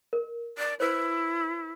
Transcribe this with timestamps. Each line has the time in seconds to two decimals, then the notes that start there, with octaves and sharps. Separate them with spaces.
0.13 A#4
0.58 D5
0.80 E4 B4 C5